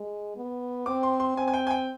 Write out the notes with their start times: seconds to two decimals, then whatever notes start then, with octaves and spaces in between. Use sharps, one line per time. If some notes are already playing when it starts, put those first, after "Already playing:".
Already playing: G#3
0.36 B3
0.86 C4 D6
1.03 C6
1.20 C6
1.37 C4 G#5
1.48 G#5
1.54 G5
1.67 G#5
1.70 G5